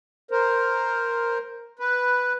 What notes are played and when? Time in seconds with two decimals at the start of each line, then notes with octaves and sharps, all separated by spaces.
0.31 A#4 C5
1.79 B4